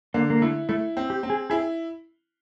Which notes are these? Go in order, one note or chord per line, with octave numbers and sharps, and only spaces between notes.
D3 A#3
A#3
A3 E4
A3 E4
C4
G4
C4
G#4
E4 G#4